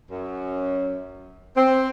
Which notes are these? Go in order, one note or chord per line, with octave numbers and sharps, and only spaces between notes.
F#2
C4